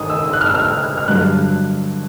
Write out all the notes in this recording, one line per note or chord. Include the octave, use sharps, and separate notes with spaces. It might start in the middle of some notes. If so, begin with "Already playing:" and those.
Already playing: A1 G#2 D#3 G#3 D#6
E6
F#6
F6
E6
F6
F6
G2 D3 F#3 F#6